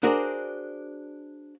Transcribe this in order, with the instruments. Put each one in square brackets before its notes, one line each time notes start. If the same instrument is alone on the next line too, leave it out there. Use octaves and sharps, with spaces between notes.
[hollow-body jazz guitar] D4 F#4 G#4 A#4 C5 D5